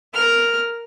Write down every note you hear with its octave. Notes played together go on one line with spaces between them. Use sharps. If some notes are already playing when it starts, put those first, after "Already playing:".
A#4 F6